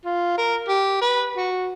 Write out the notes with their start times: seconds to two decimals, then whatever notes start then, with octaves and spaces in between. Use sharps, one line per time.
0.05 F4
0.38 A#4
0.68 G4
1.01 B4
1.37 F#4